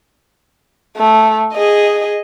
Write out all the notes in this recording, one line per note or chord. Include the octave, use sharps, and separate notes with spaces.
A3
G#4 D#5